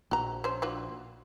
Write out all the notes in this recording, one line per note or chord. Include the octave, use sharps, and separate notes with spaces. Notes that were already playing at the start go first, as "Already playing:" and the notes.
A#1 F#4 A#5
C#4 C5
D4 F4 F#4